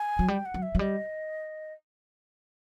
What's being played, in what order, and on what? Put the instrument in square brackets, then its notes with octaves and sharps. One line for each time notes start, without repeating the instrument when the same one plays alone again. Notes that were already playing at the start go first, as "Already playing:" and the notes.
Already playing: [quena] G#5
[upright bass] F#3
[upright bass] G3 [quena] G5
[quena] F#5
[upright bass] F#3
[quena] E5
[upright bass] F#3
[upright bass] G3 [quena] D#5